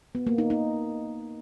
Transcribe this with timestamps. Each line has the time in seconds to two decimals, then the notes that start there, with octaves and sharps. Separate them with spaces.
0.15 B3
0.27 A#3
0.38 D#4
0.50 D#4